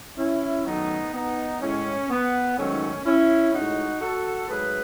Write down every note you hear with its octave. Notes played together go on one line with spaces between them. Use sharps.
C#4 E4
F#2 D#3 F#3 A3 B3 D#4
B3 D#4
A2 G#3 C#4
B3
G#2 D#3 F#3 A3 C#4
C#4 E4
A2 G#3 D#4 F#4
F#4 A4
G#2 F#3 A3 G#4 B4